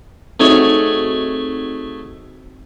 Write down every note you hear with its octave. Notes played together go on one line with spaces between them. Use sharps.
A3 C4 D#4 F#4 G#4 C#5